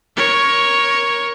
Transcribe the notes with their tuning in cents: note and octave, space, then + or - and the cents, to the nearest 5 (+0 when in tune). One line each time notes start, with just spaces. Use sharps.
A#4 +15 C#5 +0